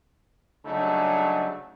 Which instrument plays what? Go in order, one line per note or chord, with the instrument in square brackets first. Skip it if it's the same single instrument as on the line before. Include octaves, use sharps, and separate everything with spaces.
[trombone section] G2 C#3 F#3 A3 D4 D#4